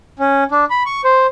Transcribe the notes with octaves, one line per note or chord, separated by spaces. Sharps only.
C#4
D4
B5
C#6
C5